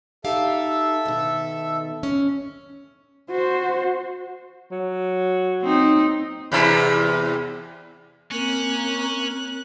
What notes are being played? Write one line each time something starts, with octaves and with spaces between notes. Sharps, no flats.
D#4 G4 A4 E5 F5
B2 D#3
C#4
F#4 C5
F#3
C4 D#4
E2 C3 E4
A#3 C4 C#4 F#6